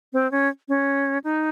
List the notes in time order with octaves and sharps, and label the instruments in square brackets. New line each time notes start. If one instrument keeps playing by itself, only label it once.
[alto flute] C4
C#4
C#4
D#4